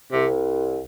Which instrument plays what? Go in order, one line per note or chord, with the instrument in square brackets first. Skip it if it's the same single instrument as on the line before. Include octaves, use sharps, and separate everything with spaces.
[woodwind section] C2 [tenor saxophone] C3